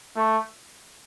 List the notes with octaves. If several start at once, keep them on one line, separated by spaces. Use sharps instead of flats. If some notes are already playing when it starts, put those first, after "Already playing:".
A3